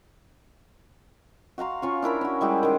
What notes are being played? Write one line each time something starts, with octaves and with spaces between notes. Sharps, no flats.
F#4 F5 A#5 C6
C#4 F4 C#6
D4 E4 A#4 B5
C#4 F#4
G3 G#3 E4 G4
D#3 G#3